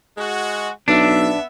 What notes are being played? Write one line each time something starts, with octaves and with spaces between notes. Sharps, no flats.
G#3 F#4
B1 B3 D4 E5